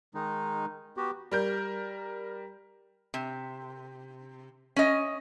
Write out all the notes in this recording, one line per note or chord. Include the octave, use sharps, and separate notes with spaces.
D#3 G#3 D#4
B3 F#4 G4
G3 A#4 G6
C3
C#4 D#5